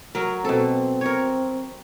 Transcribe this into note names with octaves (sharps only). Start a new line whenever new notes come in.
F#3 A#4
B2 C4 A4
A#4 C#5